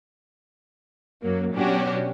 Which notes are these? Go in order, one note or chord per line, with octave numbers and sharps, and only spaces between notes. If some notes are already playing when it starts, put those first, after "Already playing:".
F#2 F#3 A#3
B2 F#3 C#4 D4 F#4 G4